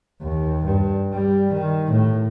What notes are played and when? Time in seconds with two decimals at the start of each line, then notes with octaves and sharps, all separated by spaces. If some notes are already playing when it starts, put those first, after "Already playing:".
0.22 D#2
0.64 G2
1.13 G3
1.53 D#3
1.91 A2